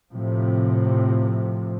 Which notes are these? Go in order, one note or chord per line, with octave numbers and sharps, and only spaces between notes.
A2 C3 F3